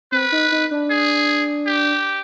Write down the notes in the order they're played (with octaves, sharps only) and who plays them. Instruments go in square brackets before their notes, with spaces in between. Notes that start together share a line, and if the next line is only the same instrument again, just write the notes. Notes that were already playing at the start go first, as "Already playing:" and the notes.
[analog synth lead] C4 [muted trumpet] B4
[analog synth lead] D#4
D#4
D4
[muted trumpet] G#4
G4